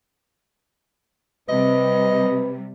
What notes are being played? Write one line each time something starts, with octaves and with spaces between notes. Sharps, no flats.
C3 G3 B4 D#5